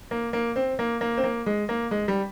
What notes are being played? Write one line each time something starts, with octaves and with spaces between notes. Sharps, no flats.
A#3
A#3
C4
A#3
A#3
C4
A#3
G#3
A#3
G#3
G3